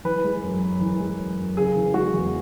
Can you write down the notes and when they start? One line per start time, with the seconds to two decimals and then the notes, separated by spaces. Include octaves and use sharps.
0.05 E3 B4
0.24 G#3
0.42 F#2
0.62 F#2
0.81 E3
1.00 G#3
1.18 F#2
1.38 F#2
1.57 C#3 G#4
1.76 E3
1.94 G#3 F#4
2.14 E2